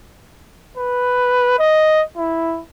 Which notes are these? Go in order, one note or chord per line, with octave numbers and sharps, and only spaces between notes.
B4
D#5
E4